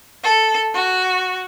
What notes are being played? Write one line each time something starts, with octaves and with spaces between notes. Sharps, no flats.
A4
F#4